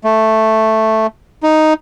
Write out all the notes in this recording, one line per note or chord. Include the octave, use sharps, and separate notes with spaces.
A3
D#4